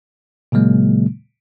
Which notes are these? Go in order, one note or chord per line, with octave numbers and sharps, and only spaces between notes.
A#2 C#3 F#3 G#3 A#3